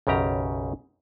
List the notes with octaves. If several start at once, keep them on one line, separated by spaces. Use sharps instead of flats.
B1 F#2 C#3 G4 A#5